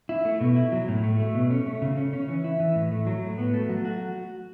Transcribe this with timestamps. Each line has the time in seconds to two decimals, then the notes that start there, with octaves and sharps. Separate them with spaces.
0.09 E4
0.25 A3
0.41 B2
0.56 E4
0.72 F#3
0.88 A2
1.03 A3
1.20 A3
1.35 B2
1.50 C#4
1.66 A3
1.82 C#3
1.97 C#4
2.13 C#4
2.28 E3
2.44 E4
2.60 E3
2.76 A2
2.91 A3
3.07 F#3
3.23 A2
3.38 B3
3.54 A3
3.69 F#3
3.85 F#4